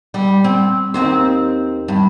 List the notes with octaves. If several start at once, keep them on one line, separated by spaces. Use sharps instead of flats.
G3
C4
D#2 C4 C5
G2